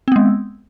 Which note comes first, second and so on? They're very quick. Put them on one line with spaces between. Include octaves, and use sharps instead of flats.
C4 B3 G#3